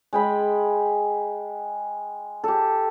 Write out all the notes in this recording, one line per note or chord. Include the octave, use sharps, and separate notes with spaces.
G#3 G5 B5
G4 A4